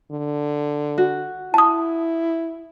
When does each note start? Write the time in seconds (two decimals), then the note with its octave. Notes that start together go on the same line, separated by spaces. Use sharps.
0.11 D3
0.98 F#4
1.54 E4 A5 D#6